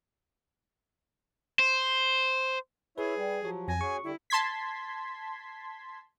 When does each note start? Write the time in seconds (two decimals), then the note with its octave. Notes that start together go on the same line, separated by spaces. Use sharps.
1.59 C5
2.98 E4 G#4 B4 C#5 E5
3.17 G3
3.43 F3 F#3 G4 C#5
3.68 F2 G#5 A#6
3.81 C#4 F#4 G#4 C#6
4.04 D3 G3 E4
4.30 A5 C6 G#6 B6